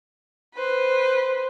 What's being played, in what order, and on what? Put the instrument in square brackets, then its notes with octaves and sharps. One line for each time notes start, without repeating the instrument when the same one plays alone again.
[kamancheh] B4 C5